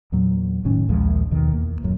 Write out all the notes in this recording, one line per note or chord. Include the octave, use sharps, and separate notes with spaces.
E2 A#2 F#3
F1 A2 D#3 C#4
A#1 D#2 F3 G#3
D#2 B2 D#3
E2 A#3
D#1 F#2